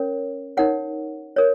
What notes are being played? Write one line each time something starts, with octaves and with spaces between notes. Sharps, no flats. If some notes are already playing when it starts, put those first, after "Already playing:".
Already playing: C#4 A#4 C#5
D#4 A#4 C#5 F#5
A#4 C#5